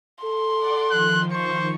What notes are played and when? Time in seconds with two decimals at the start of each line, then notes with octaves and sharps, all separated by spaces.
0.24 A4 C6
0.58 D5 F#5 D6
0.91 D#3 F3 F#6
1.32 C5 C#6